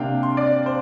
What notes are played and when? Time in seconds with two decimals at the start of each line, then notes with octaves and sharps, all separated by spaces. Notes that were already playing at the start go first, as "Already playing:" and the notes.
Already playing: C3 A#3 D4 F5 G5
0.23 C6
0.37 D5
0.66 C5